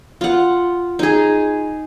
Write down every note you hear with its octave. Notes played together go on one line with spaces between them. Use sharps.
F4 F#5
D#4 G#4